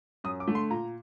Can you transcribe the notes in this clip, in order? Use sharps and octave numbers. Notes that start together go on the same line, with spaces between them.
F#2 D#6
D6
D3 A3
C6
A#2 A#5